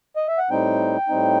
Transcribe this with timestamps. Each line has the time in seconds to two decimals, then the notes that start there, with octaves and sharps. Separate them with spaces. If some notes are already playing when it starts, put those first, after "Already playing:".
0.16 D#5
0.28 E5
0.38 F#5
0.50 A2 G3 C4 D#4 G5
1.09 A2 G3 C4 D#4